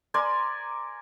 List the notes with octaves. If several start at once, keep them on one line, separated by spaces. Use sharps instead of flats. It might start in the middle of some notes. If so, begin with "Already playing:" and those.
A#4 D5 G#5 C6